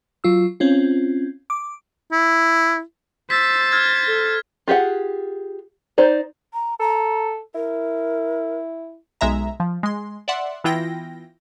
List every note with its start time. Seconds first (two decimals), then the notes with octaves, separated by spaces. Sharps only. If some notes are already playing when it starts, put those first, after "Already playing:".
0.24 F#3 F4 E6
0.60 C4 C#4 F4
1.50 D6
2.12 E4
3.30 C5 E6 A6 B6
3.72 F6 G#6
4.06 A4
4.68 F4 G4 G#4 F#5
5.98 D#4 C5 D5
6.54 A#5
6.80 A4 A#5
7.55 E4 A#4
9.21 B1 G#3 E5 A#5
9.60 F3
9.83 G#3 C6
10.28 D5 E5 F#5 C6
10.64 E3 B3 E4 F4 G5 A#6